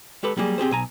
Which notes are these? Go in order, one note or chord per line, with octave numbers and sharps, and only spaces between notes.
G#3 G4 A4 B4
F#3 G3 A#3 D#4 G#4
C4 G4 G#4 C5
B1 G#5 A#5